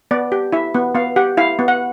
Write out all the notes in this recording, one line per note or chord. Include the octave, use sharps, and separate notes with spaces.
B3 D5
G4
E4 E5
B3
B3 F5
G4 F#5
E4 F5
B3
F#5